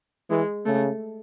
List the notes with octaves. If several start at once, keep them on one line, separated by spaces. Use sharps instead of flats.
E3 G#3
C#3 A3